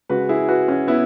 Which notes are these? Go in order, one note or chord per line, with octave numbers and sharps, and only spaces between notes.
C#3 G#3 F#4 B4
E4 G#4
F#4 B4
C#4 F#4
B3 E4